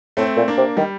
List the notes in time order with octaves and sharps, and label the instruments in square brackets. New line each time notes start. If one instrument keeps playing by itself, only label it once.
[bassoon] A2 [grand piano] A3 C4
[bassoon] A#2
[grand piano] A#3 D4
[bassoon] C3
[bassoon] D#3 [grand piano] G3